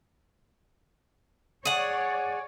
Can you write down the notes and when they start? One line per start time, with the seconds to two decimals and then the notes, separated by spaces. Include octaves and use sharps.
1.65 G#4 C#5 D5 F#5